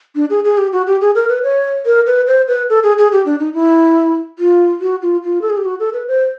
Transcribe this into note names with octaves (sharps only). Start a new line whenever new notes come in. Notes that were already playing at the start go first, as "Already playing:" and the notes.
D4
G#4
G#4
G4
F#4
G4
G#4
A#4
B4
C#5
A#4
B4
C5
B4
A4
G#4
G#4
G4
D4
D#4
E4
F4
F#4
F4
F4
A4
G#4
G4
F#4
A4
B4
C5